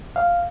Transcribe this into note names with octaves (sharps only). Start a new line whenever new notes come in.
F5